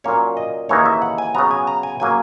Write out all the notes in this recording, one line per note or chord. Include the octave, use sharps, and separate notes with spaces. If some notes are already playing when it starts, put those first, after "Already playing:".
A#2 F#3 A#3 C#4 C#5
D#5
D#2 C#3 E3 A#3 D#4 C#5
E5
F#5
G#5
C#3 F#3 B3 A#5
G#5
A#5
G#5
C#3 F#3 A#3 G#5